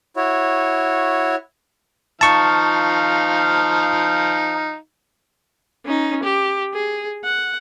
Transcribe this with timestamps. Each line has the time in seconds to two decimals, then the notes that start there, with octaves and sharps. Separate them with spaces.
0.16 E4 F#4 C#5
2.21 F3 D#4 F5 A5 C#6
5.86 C#4 D#4
6.23 G4
6.74 G#4
7.25 F#5